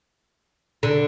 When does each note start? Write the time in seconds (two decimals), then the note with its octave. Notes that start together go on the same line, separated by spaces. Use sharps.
0.83 D3